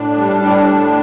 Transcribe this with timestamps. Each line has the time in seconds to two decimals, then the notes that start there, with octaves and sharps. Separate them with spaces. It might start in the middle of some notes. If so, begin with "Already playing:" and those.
Already playing: A2 D4
0.18 G3
0.41 A2 D4
0.65 A2